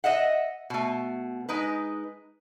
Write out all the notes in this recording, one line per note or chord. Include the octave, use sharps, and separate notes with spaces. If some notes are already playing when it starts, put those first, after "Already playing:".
D#5 E5 F#5
B2 A3
G#3 D#4 B4